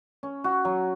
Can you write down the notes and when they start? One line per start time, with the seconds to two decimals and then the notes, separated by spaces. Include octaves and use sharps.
0.23 C#4
0.44 F#4
0.65 F#3